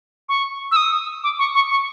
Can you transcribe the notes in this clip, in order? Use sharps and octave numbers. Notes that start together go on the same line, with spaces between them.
C#6
E6
D#6
D6
C#6
C#6
C#6